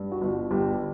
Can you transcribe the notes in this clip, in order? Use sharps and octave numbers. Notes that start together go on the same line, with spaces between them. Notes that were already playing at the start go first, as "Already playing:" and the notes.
Already playing: G2
F#4
G1
G1 G4